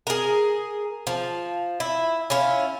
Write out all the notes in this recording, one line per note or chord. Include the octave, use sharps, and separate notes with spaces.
G#4 A#4
F3
E4
C#4 E4 F4